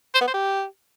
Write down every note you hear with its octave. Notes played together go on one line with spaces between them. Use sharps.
C5
B3
C5
G4